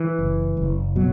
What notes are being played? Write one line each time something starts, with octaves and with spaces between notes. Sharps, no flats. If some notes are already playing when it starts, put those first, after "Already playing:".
Already playing: E3
F#1
F#1
B2 F#3